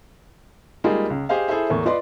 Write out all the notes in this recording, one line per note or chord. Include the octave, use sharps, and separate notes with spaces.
G3 G#3 A#3 D#4 F4 G#4
C#2
G4 G#4 C5 D#5 F5
E4 G#4 A4 C5 E5
E2 A2 A#3
F4 B4 D5 D#5 C6